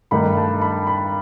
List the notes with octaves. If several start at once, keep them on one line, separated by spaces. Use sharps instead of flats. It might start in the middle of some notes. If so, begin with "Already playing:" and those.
G2 D#3 A3 D#4 B5
A5
B5
B5